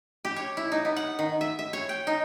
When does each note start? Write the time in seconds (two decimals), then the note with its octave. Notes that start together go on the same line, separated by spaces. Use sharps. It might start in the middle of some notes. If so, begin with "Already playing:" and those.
0.25 G4
0.36 C#5
0.57 E4
0.72 D#4
0.85 B3
0.96 F#5
1.19 D#3
1.41 E5
1.59 E5
1.73 C#5
1.89 G5
2.07 D#4